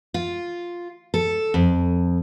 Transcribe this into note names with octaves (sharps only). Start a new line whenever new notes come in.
F4
A4
F2